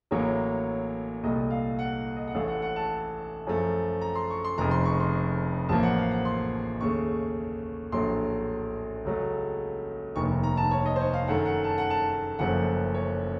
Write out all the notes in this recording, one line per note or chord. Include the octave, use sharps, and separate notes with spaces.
A1 A2 F#3 A#3 C#5
C2 A#2 A3 D#5
F5
F#5
D#5
F#5
A1 A2 A3 F5
F#5
F#5
A5
F#2 F3 A3
A#5
C6
C#6
C6
F1 F2 C#3 A#5
C6
C#6
C6
A1 A2 F3 A#3 A5
F#5
F5
F#5
C6
D#2 C#3 A3 C#6
A#1 A2 F#3 A3 C6
C#2 C#3 F#3 A3
F1 D#2 D#3 C#6
A#5
A5
C#5
D#5
C5
C#5
F5
F#2 D#3 A3 F#5
F#5
A5
F#5
A5
F#1 F#2 F3 A3 F#5
C#5